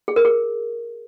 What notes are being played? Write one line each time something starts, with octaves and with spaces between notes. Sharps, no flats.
G#4
A#4
G#4